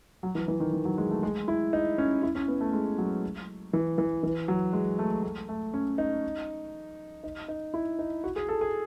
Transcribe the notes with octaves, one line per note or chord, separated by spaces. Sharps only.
F#3
E3
E3
D#3
D#3
F#3
G#3
A3
G#3
E4
D#4
C#4
E4
C#4
B3
A3
G#3
F#3
E3
E3
E3
F#3
G#3
A3
A3
A3
C#4
D#4
D#4
D#4
E4
D#4
F#4
G#4
A4
G#4